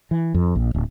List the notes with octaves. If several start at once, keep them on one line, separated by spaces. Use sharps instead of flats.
E3
F2
A#1
D1